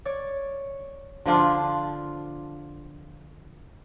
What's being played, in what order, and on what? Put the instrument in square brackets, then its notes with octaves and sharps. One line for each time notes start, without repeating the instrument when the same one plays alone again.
[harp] C#5 D5
[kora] D3 F3 D4 F4